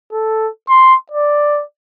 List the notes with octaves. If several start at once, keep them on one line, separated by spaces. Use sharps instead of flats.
A4
C6
D5